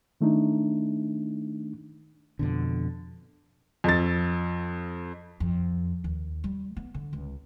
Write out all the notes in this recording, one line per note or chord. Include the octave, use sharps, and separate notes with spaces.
D#3 A3 D4 D#4
F2 B2 D3
F2 A6
F2
D#2
G3
B3
D3
C#2